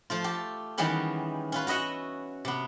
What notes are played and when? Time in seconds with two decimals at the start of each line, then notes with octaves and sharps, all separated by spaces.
0.10 F3 A3 F4
0.24 G4 A4
0.78 D#3 E3 G3 G#3 B3 C#4
1.52 C#4 F4 B4
1.67 F#4 B4 D#5 E5 F#5
2.45 C3 B3